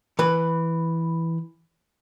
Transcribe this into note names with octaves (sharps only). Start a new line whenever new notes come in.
E3 B4